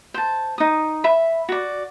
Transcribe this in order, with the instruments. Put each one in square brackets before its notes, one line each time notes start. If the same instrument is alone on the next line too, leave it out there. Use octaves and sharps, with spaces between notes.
[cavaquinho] C5 A5
D#4 D#6
E5 B5
F#4 D5